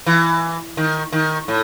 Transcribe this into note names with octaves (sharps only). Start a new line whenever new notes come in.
E3
D#3
D#3
A2